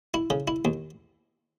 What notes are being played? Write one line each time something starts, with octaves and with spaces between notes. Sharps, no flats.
E4
C#3
E4
D#2